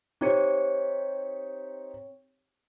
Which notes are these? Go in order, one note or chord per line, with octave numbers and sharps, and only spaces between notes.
C4 D#4 G4 C5 C#5 C#7